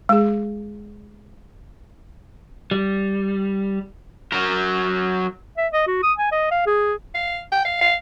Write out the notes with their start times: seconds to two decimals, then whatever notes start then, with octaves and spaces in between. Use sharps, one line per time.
0.09 G#3 G#4
2.71 G3
4.33 F#3 A#4
5.58 E5
5.73 D#5
5.87 F#4
6.03 D#6
6.18 G#5
6.32 D#5
6.51 F5
6.67 G#4
7.15 F5
7.52 G5
7.65 F5
7.81 F5